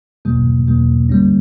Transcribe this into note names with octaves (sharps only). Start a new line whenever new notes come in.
E2 B2 F#3 A#3
E2 B2 F#3 A#3
D3 G3 A#3 C#4